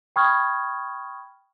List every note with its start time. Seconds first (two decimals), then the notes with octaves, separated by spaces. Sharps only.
0.16 G5 B5 C#6 D#6 F6 G#6